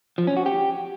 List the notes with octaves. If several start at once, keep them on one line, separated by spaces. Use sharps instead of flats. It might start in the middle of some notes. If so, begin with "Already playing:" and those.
F3
C#4
F#4
G4